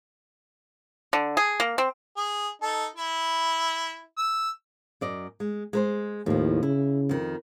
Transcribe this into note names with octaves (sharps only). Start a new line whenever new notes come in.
D3
G#4
A#3
C4
G#4
D#4 A4
E4
E6
F#2 D5 D#5
G#3
G#3 B4 C5
D#2 A2 F3
C#3 E4
F2 D#3